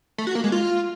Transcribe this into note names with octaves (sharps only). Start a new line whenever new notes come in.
A3
F#4
A#3
G#3
F4